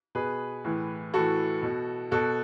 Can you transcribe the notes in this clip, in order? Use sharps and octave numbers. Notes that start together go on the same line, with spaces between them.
B2 G#4 B4
A2 E3
A2 E3 F#4 A4
B2
B2 F#4 A4